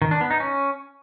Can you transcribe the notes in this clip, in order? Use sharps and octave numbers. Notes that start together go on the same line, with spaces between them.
D#3
D4
B3
D#4
C#4